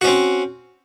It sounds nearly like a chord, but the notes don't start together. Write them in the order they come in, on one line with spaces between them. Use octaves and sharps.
F#4 C#4 C4